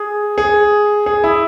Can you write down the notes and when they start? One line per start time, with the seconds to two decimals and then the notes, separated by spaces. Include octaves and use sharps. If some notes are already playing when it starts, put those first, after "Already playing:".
Already playing: G#4
0.38 G#4
1.06 G#4
1.24 E4